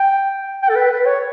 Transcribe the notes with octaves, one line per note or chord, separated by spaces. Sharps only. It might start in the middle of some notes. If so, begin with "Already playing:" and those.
Already playing: G5
G5
A4
B4
B4
C#5